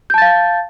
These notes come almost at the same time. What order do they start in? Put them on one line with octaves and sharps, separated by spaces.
G6 A5 A6 F5